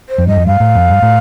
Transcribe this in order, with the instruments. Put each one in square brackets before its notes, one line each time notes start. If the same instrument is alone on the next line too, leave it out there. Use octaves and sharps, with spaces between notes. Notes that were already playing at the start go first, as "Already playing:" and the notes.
[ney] C5
[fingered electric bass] F2
[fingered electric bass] G2 [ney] D#5
[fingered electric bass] F2
[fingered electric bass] G2 [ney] F5
[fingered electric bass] A2
F2
G2
A2